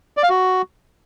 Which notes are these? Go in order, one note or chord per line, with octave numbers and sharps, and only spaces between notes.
D5
F5
F#4